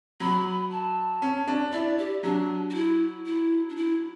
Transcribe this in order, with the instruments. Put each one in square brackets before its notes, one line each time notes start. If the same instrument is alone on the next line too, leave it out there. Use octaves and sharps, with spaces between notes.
[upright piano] F#3 [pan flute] B5
[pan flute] A5
[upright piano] C#4
D4
[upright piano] E4 [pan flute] D5
[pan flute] G4
[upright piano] F#3 [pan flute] D4
[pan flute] F#4
E4
E4
D4
E4